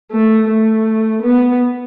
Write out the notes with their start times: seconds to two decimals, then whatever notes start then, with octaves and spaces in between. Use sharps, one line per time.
0.12 A3
0.48 A3
1.23 B3